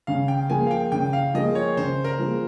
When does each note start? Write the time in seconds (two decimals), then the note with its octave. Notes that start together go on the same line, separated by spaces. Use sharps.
0.07 C#3 F5
0.28 G5
0.50 F3 A#3 F4 G#4 G#5
0.67 F5
0.71 G5
0.92 C#3 G5
1.13 F5
1.34 F3 A#3 F4 G#4 D#5
1.55 C#5
1.77 C#3 C5
2.04 A#4
2.19 F3 A#3 F4 G#4